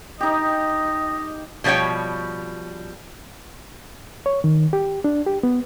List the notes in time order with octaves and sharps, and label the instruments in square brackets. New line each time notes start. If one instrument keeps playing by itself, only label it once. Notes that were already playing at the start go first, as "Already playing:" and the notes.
[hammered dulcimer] D#4 G4 [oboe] D#5
[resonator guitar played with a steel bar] B2 F3 G3 C#5 G5
[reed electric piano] C#5
D#3
G4
D4
G4
B3